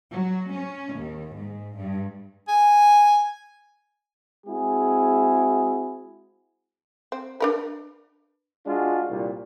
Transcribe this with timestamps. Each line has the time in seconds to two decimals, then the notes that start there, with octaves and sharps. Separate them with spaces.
0.13 F#3
0.52 C#4
0.98 D#2
1.37 G#2
1.77 G2
2.48 G#5
4.46 G#3 C4 E4 F#4 G#4
7.12 C4
7.40 D4 A#4 B4
8.67 G#3 D4 F4 F#4
9.09 C2 A#2